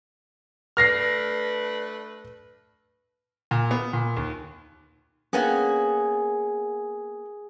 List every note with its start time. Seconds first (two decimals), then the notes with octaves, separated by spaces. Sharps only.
0.77 A3 D4 B4 F6 A#6 C7
3.51 A#2
3.71 B3
3.93 A#2
4.17 D#2
5.33 A#3 B3 C#4 G#4